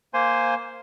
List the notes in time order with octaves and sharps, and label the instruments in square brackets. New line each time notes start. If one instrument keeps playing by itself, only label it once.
[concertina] A#3 C5 G#5 C6